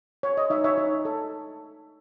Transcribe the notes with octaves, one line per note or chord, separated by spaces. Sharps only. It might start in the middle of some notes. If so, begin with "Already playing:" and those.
C#5
D#5
D#4 C#5 E5
C#5 E5
D#4
A4